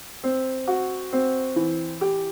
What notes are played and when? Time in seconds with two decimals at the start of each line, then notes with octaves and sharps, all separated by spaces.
0.24 C4
0.67 F#4
1.13 C4
1.56 E3
2.01 G4